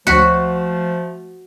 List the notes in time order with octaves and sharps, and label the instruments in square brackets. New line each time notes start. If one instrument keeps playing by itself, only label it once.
[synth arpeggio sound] D2 B6 C#7 [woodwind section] F3 A3 [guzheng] F#4